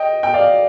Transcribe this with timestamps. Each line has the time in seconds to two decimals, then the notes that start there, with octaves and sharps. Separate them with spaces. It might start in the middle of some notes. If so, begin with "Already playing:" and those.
Already playing: D#5 G5
0.23 G5
0.34 D5 F5